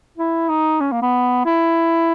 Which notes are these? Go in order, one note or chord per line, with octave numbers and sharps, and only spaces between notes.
E4
D#4
C#4
A#3
B3
E4